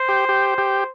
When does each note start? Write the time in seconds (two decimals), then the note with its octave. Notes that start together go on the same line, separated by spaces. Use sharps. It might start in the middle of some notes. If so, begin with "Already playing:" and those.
Already playing: C5
0.09 G4
0.29 G4
0.58 G4